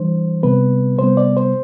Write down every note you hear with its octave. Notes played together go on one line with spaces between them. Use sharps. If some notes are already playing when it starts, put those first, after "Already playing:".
Already playing: E3 G3 D4 C5
C3 G3 B3 B4
C3 G3 B3 C5
D5
C5